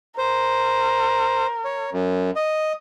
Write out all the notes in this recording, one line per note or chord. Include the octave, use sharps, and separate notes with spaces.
A#4 C5
C#5
F#2
D#5